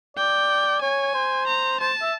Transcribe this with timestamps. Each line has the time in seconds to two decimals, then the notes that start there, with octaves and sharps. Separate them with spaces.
0.17 D5 G5
0.82 C#5 G#5
1.14 C5
1.47 A#5
1.80 C5 A5
2.02 E5